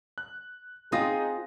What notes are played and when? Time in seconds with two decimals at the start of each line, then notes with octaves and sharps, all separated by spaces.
0.18 F#6
0.92 C4 D#4 F4 G#4 D#6 A#6